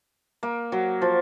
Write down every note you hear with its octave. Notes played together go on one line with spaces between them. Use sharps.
A#3
F#3
F3